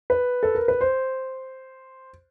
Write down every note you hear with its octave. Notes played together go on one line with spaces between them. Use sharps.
B4
A4
A#4
B4
C5